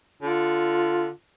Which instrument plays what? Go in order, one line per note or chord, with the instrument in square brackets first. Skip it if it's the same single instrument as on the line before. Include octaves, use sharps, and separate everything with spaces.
[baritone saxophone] D3 [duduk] F4